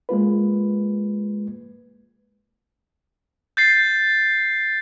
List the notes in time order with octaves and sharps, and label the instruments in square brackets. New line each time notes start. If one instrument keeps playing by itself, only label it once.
[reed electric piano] G#3 A#3 F4 B4
[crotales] G6 A6 C7